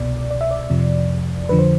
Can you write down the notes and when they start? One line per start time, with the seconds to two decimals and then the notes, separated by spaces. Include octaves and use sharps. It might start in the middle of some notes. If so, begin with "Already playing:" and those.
Already playing: C2 B2 D5
0.31 D5
0.41 E5
0.51 D5
0.70 F2 C3 F3
1.49 F2 D3 F3 B4
1.59 C5